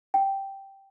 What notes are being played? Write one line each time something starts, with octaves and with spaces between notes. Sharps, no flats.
G5